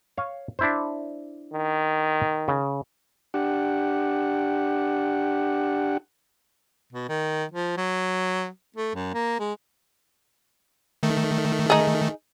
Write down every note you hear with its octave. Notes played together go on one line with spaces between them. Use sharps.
C#5 F5
D4 E4 C5
D#3
C#3
D4 G4 F#5
B2
D#3
F3
F#3
A3
F#2
A#3
G#3
D#3 A3
D#4 G#4